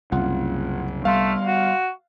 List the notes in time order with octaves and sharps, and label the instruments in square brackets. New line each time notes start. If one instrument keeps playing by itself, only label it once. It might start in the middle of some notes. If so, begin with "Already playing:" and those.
[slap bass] C2 [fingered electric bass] F#2 C#3 [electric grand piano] F4 F#5
[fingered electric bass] G3 B3 [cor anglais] A3 [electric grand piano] F5 C6
[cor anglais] F#4